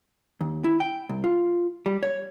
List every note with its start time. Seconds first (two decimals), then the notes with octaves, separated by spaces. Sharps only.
0.41 D#2
0.64 E4
0.80 G5
1.09 C2
1.24 F4
1.86 G3
2.03 C#5